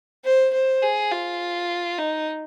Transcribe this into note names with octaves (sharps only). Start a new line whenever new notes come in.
C5
C5
G#4
F4
D#4